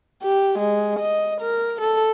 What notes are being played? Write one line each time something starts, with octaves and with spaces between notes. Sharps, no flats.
G4
G#3
D#5
A#4
A4